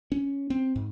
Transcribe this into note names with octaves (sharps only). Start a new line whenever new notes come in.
C#4
C4
G#2